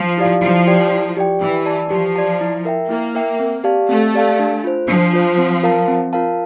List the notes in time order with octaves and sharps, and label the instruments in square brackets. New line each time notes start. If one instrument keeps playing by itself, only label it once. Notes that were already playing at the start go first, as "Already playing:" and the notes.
Already playing: [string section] F3
[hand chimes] E4 G4 D5 F5
[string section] F3 [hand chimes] E4
[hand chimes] G4 D5 G5
E4
G4 D5 G5
[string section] E3 [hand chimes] G4
[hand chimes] D5 A5
[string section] F3 [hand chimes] G4
[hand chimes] D5 A5
E4
A#4 E5 G5
[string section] A#3 [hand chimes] E4
[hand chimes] A#4 E5 G5
C4
G4 D5 F5 A5
[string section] A3 [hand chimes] C4
[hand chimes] G4 D5 F5 A5
D4
F4 C5
[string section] F3 [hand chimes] D4
[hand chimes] F4 C5
C4
F4 A#4 F5 A5
C4
F4 A#4 F5 A5